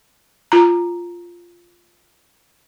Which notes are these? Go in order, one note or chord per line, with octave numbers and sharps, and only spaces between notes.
F4 A#5